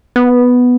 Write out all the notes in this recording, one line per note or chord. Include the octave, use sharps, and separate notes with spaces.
B3